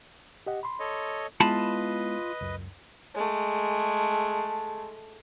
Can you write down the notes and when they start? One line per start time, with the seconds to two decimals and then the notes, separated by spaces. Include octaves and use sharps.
0.46 G4 D#5 F#5
0.63 B5 C6
0.80 A4 C#5 D#5
1.41 G#3 B3 E4 F4 B4 D#5 A5 B5
2.41 C#2 F#2
3.15 G#3 A3